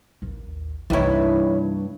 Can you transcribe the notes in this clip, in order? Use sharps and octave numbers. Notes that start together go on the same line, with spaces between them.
A1 D#2
C2 G2 E3 A#3 D#4 E4 C#5